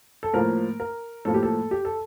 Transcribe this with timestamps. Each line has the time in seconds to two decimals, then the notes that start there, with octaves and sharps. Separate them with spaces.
0.23 A4
0.34 A2 F3 A#3 A#4
0.80 A#4
1.25 A2 F3 A#3 A4
1.34 G4
1.43 A4
1.71 G4
1.85 A4